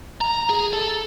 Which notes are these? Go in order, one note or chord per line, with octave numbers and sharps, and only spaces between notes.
A#5
G#4
A4